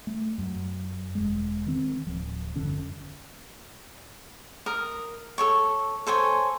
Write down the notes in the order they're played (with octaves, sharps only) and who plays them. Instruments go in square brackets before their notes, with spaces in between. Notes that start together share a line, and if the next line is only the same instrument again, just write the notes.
[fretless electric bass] A3
F#2
E1 G#3
D#3 C4
D1 F3
G1 F2 D3 C#4
[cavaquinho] A#4 A#5 D#6
A4 C#5 C#6
A4 C5 C#5 G#5